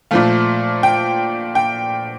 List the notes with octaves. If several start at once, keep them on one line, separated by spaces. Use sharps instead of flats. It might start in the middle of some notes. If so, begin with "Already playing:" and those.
A#2 F3 A3 F5
G5
G5